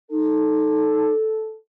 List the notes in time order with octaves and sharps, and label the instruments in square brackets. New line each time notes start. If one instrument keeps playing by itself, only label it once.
[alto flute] D#4 [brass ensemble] A4